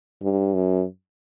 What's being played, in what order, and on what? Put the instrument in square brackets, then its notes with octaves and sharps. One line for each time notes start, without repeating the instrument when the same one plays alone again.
[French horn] G2
F#2